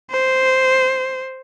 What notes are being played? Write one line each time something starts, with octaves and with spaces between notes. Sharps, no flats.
C5